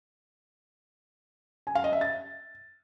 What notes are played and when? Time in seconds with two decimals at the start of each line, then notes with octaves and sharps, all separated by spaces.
1.67 G#5
1.75 F5
1.84 D#5
1.93 E5
2.01 A6